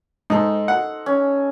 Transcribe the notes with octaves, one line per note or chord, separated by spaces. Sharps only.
G#2 D#4 A4 C5
F#5
C#4